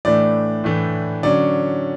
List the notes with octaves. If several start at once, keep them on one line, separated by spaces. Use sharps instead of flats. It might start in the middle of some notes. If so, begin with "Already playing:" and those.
A2 E3 A3 D4 D5
A2 E3 A3 D4
D3 F#3 C#4 D5